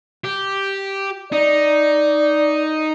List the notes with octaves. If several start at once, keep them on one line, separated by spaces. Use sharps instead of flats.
G4
D#4 D5